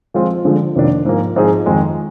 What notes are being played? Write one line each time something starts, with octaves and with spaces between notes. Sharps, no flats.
F3 G#3 C4 F4
D3 F3 G#3
F2 C3 D#3 A#3 D4
G#2 F3 A#3
G#2 F3 C4 D#4 G#4
F2 D#3 G#3